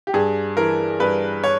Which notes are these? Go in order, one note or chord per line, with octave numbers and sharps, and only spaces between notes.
G4
G2 G#4
E3 A#4
G2 B4
C#5